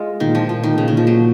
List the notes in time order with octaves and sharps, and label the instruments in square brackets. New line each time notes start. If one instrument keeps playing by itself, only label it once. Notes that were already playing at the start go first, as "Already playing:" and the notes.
Already playing: [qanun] G#3 F4
[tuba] A#2 [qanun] D#3
[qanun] F3
[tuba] A#2 [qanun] F3
[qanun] D#3
[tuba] A#2 [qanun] C#3
[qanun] D#3
F3
F#3